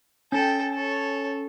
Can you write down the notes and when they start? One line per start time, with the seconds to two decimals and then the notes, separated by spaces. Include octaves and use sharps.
0.32 C#4 A4 G5
0.74 A4 C#5